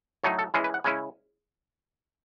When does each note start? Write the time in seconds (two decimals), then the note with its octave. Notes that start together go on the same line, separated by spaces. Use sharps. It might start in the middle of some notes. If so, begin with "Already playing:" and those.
0.24 A2 F#3 A3 D#4 C#5
0.39 A4
0.54 E3 G#3 C#4 E4 G#4
0.64 B4
0.74 F#5
0.84 C#3 G#3 C#4 E4 G#5